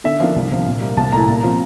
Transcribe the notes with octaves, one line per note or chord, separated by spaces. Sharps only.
D3 E5
F3 A#3 D4 F5
C2
C3 F3
A#2
G3 A#3
C2 A5
A#2 A3 E4 A#5
A#2
F3 C4 F4